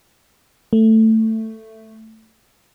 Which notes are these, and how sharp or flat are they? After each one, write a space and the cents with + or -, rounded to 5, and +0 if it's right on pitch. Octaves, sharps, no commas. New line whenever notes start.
A3 +10